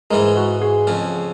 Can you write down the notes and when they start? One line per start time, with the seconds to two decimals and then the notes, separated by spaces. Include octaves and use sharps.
0.10 G#2 E3 G#3 G#4 A#4
0.36 F#4 G#4
0.62 F#4 G#4
0.87 F2 C#3 F3